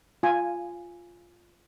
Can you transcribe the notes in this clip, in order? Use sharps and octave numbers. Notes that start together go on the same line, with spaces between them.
F4 G#5